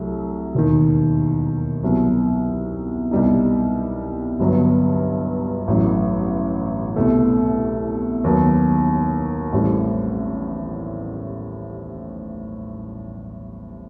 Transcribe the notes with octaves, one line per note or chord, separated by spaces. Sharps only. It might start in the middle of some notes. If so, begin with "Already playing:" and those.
Already playing: C2 F#3 A3
E1 D#2 D#3
C2 B2 F#3
C2 B2 G3 D#4
G1 G2 F#3 B3
A1 A2 F#3
C2 B2 A3
D#2 D#3 F#3 B3
A1 A2 G3 C4